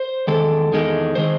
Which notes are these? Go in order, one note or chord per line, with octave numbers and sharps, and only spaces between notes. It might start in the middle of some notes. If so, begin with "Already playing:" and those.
Already playing: C5
E2 D#3 G#3 A4
E2 D#3 G#3
D#3 G#3 C5